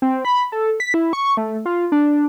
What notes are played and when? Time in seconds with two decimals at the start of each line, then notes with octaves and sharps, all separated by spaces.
0.02 C4
0.25 B5
0.52 A4
0.80 B6
0.94 E4
1.13 C#6
1.37 A3
1.66 F4
1.92 D4